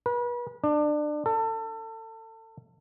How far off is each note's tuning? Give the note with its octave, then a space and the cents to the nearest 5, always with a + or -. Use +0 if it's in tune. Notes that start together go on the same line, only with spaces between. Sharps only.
B4 -35
D4 +25
A4 +30